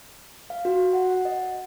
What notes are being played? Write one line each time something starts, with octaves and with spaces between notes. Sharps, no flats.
F5
F#4
F#5
D#5